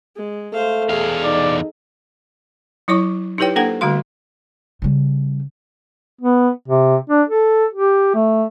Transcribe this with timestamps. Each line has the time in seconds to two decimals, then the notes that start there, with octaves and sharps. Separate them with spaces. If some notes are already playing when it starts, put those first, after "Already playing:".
0.16 G#3
0.53 A3 C5 F5
0.89 E2 G#4 A4 F5
1.24 D#4 D5
2.88 F#3 E4 C#5 C#6 D6
3.38 D#4 E4 G4 B4 C#5 G5
3.56 A#3 D4 A4 C5 F#5 G5
3.81 D3 G3 A3 F#4 F5 C6
4.82 C#3 G3
6.21 B3
6.68 C3
7.10 D4
7.29 A4
7.73 G4
8.15 A3